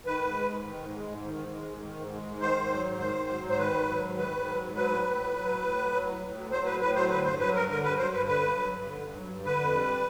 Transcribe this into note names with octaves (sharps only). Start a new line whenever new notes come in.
D#3 B4
G#2
G#3
G#2
D#3
G#2
G#3
G#2
D#3
G#2
G#3
G#2
D#3
G#2
G#3
G#2
D#3 C5
G#2
F#3
G#2
D#3 C5
G#2
F#3
G#2
C5
D#3 B4
G#2
F#3
G#2
D#3 B4
G#2
F#3
G#2
F#3 B4
A2
A2
F#3
F#3
A2
A2
F#3
F#3
A2
A2
F#3
F#3 C5
A2 B4
A2 B4
F#3 C5
D3 B4
G2 C5
F#3 B4
G2 A#4
D3 A#4
G2 B4
F#3 C5
G2 B4
D3 B4
G2
F#3
G2
D3
G2
F#3
G2
D3 B4
F2
G3